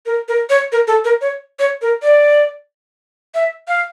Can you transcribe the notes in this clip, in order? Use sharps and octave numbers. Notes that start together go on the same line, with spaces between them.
A#4
A#4
C#5
A#4
A4
A#4
C#5
C#5
A#4
D5
E5
F5